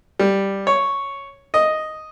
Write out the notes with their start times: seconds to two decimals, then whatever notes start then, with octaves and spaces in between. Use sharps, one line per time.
0.19 G3
0.67 C#5
1.54 D#5